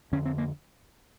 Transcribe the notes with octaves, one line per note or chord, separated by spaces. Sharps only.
F2 D3 C#4
C4
A#3